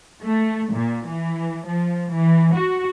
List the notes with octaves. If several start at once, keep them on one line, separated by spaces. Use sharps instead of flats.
A3
A#2
E3
F3
E3
F#4